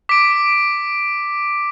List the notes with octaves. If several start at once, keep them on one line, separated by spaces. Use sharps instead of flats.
D6 B6 D7